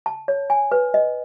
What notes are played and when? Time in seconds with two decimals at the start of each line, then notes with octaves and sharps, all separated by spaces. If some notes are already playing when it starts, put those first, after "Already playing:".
0.06 A5
0.28 C#5
0.50 G#5
0.72 B4
0.94 D#5